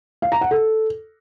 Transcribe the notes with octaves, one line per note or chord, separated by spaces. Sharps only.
F5
A#5
F#5
A4